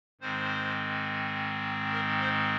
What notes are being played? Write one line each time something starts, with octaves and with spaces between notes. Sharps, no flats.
G#2 D#3 G#3 C4 C5
A#4
C5